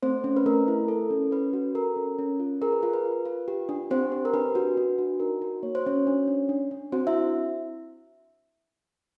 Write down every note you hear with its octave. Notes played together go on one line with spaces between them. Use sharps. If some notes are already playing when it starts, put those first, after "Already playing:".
A3 C4 C5
C#4
B4
A3 A#4
E4
A4
C#4
C#4 B4
F#4
A4 A#4
C#4
C#4
F4
G#4 A#4
B4
F4 A#4
B4
F4
F4
G4
D4
C4 G4 C5
G4
A#4
D4 B4
F#4
D4
F#4
D#4 A#4
F#4
A#3 C#5
C5
C#4 F#4 C#5
D4
D4
D4
D4
C4 F#4 C5
E4 E5